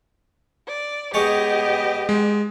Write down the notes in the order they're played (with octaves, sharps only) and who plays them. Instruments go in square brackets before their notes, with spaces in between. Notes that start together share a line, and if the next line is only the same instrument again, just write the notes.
[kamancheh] D5
[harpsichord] G#3 C#5 [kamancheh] B3 G4 [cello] D#5
[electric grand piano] G#3